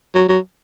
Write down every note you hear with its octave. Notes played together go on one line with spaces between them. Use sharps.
F#3
F#3